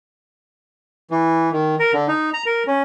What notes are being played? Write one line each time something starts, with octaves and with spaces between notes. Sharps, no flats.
E3
D#3
A#4
D3
D#4
A#5
A#4
C#4